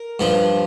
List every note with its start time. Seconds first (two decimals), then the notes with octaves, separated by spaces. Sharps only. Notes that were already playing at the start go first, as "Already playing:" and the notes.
Already playing: A#4
0.20 G2 F3